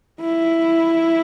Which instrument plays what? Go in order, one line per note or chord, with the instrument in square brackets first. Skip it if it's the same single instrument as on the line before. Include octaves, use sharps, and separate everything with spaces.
[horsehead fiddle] E4